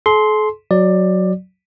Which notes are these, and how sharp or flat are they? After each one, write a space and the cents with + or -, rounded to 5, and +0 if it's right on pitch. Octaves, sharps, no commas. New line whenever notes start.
A4 -45 C6 +0
F#3 +0 D5 +15